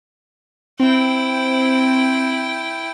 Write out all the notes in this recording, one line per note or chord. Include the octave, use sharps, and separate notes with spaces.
C4 E4 G5